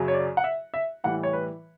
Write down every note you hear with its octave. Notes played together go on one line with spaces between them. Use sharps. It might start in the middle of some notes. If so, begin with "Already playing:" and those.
Already playing: F#2 C#3 F#3
C#5
D5
F#5
E5
E5
A2 E3 G3 F#5
C#5
B4